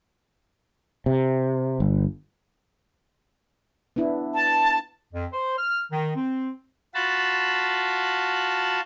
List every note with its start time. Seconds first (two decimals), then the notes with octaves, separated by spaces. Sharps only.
1.06 C3
1.80 G1
3.96 B3 D4 E4
4.34 A5
5.14 F2
5.33 C5
5.58 F6
5.92 D#3
6.16 C4
6.94 F4 F#4 A5 B5